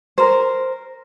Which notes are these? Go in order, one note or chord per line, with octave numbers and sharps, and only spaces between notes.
A#4 C5